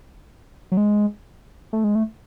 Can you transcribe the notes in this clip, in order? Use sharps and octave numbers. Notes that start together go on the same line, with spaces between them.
F#3
G#3
A3
G#3
A3